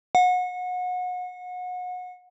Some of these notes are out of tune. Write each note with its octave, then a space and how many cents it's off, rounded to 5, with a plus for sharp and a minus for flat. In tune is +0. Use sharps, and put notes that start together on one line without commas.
F#5 -30